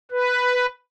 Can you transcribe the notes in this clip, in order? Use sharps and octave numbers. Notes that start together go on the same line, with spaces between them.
B4